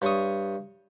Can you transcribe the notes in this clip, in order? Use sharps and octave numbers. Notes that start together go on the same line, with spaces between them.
G2 C#5 C6 C#6 D#6